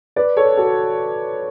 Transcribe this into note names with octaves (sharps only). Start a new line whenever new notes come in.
B4 D5
A4 C#5
F#4 A4